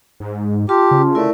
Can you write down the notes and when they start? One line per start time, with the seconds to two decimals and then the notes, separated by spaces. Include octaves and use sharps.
0.20 G#2
0.69 F4 G4 A5 C6
0.91 C#3
1.15 A3 E4 A#4 D5